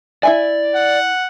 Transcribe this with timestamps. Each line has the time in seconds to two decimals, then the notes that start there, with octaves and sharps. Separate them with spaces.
0.23 E4 D5 E5 G#5
0.72 F#5